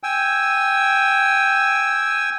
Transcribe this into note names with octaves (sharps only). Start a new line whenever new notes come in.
G5 G#5 E6